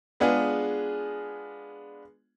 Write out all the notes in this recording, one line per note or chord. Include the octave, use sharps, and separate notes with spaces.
G#3 B3 D4 F4 G#4